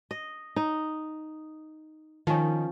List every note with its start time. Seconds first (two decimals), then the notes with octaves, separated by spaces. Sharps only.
0.11 D#5
0.56 D#4
2.27 D#3 F3 C#4